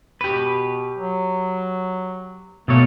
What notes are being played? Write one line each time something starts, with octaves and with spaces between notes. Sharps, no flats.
B2 G4 B4
F#3
B2 A3 A#3 C#5